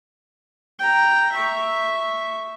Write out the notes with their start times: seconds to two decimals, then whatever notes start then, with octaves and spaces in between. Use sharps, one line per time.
0.79 G5 A#5
1.32 E5 C#6